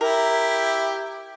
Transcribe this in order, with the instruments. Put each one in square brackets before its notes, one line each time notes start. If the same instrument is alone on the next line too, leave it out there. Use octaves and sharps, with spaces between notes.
[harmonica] E4 G4 [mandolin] A#4